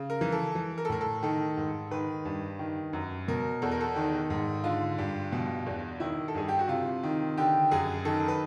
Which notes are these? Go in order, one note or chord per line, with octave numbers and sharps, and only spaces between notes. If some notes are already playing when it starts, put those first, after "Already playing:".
Already playing: C#3
A#4
E3
A4
E3
A#4
A4
A2 A#4
A4
D#3 A4
G#2
D#3 B4
G2
D#3
F#2
B2 A#4
E2 A4
A#4
A4
D#3
G#2
D3 F4
G2
B2
E2
D#3 E4
A4
G2 G#4
G4
F#4
C3 F4
D#3
D3 G4
F#2 G#4
D#3 A4
B4